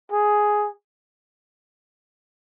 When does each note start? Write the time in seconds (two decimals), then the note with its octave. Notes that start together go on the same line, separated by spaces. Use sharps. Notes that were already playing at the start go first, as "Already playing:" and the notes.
0.12 G#4